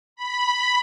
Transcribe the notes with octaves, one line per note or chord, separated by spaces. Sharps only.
B5